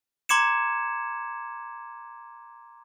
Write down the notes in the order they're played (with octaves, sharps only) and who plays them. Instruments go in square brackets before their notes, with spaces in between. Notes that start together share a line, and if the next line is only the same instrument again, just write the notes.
[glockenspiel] A#5 C6 D6 G#6 C#7 E7